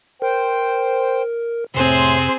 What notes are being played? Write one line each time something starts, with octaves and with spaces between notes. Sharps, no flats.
A#4 C5 G5
F2 A2 C3 C4 G#4 C5